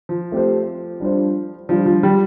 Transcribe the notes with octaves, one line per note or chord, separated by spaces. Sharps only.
F3
A3 C4 G4 C5
G3 D4 F4 C5
F3 G3 D4 F4 C5
F3
G3